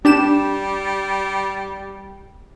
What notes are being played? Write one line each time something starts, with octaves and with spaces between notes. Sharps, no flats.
G3 D4 G4 E7